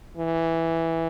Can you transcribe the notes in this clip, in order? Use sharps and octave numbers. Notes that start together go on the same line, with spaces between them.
E3